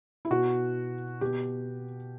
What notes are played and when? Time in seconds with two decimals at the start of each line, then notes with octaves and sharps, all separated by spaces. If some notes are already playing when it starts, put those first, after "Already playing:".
0.25 E4
0.30 B2 F#4
1.21 B2 G4